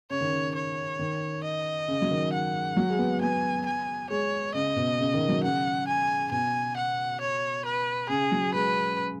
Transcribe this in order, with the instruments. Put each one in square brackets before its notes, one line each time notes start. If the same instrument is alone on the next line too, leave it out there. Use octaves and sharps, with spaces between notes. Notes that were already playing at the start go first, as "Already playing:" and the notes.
[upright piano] C#3 [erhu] C#5
[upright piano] D#3
C#3
[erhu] C#5
[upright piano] D#3
[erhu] D#5
[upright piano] C#3
F#3
D#3
[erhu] F#5
[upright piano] F#3
G#3
B3
[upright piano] B3 [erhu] G#5
[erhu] G#5
[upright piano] G#3 [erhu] C#5
[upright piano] C#3 [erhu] D#5
[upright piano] B2
C#3
D#3
F#3
[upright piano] C#3 [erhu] F#5
[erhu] G#5
[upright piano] B2 [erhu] G#5
[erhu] F#5
C#5
B4
[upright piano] C#3 [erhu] G#4
[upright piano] F#3
[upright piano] G#3 [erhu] B4